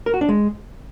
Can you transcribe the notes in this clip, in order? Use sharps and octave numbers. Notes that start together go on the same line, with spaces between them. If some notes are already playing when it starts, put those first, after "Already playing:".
A#4
F#4
D4
G#3